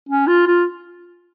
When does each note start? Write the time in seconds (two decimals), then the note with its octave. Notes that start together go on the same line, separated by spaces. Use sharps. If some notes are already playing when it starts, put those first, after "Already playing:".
0.09 C#4
0.27 F4
0.47 F4